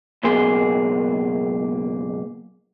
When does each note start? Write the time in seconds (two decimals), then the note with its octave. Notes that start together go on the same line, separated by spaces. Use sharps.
0.23 C#2 F#2 B2 A#3 G#4 C6